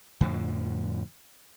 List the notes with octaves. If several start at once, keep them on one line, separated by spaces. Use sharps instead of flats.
F2 A2 D3 F3